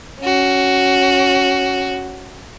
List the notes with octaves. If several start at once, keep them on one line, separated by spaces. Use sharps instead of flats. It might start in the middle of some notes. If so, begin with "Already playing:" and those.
C#4 F#4